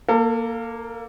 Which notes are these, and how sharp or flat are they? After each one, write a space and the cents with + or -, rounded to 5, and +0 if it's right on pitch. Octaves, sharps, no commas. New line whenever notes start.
A#3 +0 A4 +35